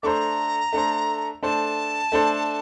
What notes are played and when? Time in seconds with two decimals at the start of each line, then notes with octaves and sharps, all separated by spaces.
0.03 A3 D4 A4 C5 A#5 D6
0.73 A3 D4 A4 C5
1.43 A3 D4 A4 C5 A5
2.12 A3 D4 A4 C5